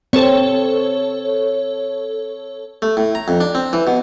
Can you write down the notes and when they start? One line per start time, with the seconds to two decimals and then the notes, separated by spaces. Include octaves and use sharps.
0.13 C4 A4 C#5
2.82 A3
2.97 A2
3.15 A#5
3.28 F2
3.41 D4
3.55 C4
3.73 E3
3.87 B2